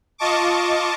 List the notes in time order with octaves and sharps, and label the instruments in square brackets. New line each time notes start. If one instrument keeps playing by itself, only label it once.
[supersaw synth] F4 D#5 A5 C#6 D6